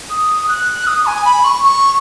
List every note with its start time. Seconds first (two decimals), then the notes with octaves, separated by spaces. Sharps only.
0.10 D#6
0.49 F#6
0.87 D#6
1.06 G#5
1.25 B5
1.44 C#6
1.63 C#6